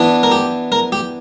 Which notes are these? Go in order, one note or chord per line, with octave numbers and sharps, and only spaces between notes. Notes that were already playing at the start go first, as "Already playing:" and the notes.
Already playing: E3 B3 D4
A#4
G4
A#4
G4